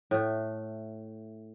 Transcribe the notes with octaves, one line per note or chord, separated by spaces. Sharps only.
A2 A3